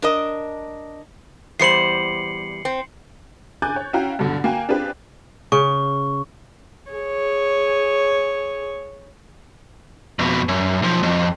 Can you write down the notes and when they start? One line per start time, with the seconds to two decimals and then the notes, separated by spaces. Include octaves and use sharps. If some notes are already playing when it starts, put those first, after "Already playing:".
0.02 D4 A#4 D#5
1.59 E2 G3 C5 C7 C#7 F#7
2.65 C4
3.62 G#5 D6 F#6 G6 A6
3.76 C#5
3.93 C#4 E4 F#4 F5 G5 A#5
4.19 G2 B2 D3 F#3
4.44 A#3 F#4 G5 G#5
4.69 C4 D4 F4 G4 G#4 B4
5.52 C#3 C#6
6.91 G#4 C#5
10.19 F2 B2
10.48 F#2
10.82 B1 F3
11.03 F2